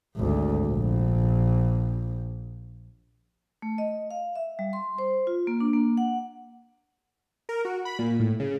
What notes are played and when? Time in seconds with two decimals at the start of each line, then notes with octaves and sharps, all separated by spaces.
0.17 G#1 D2
0.67 A#1
3.62 A3
3.78 D#5
4.11 F5
4.36 E5
4.59 G3
4.73 C6
4.98 C5
5.27 F4
5.47 A#3
5.60 D4
5.73 A#3
5.97 F#5
7.49 A#4
7.65 F#4
7.85 B5
7.99 A#2
8.20 A2
8.40 C#3